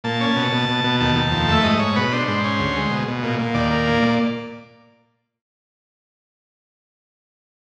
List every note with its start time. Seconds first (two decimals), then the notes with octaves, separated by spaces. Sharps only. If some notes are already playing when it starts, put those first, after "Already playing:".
0.04 A#2 A5
0.20 C#4
0.36 B2
0.52 B2
0.69 B2
0.84 B2
1.00 D#2 A5
1.16 D#2
1.32 F2
1.48 A3 E5
1.63 G#2 D#5
1.79 G#2 C#5
1.96 B2 B4
2.12 D4 C5
2.28 G#2 C5
2.44 C#4
2.59 D2
2.76 G#3
2.91 B2
3.08 B2
3.23 A#2
3.39 A#2
3.54 D#2 D5
3.71 A#3
3.87 A#2
4.03 A#2